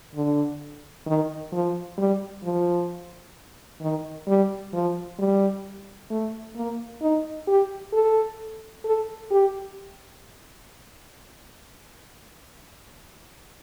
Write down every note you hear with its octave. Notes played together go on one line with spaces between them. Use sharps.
D3
D#3
F3
G3
F3
D#3
G3
F3
G3
A3
A#3
D#4
G4
A4
A4
G4